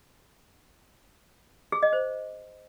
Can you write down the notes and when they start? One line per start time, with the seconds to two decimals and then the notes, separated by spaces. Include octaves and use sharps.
1.72 G#4
1.83 D#5
1.93 C5